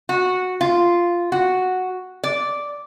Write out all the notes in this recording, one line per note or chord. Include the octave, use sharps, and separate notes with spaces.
F#4
F4
F#4
D5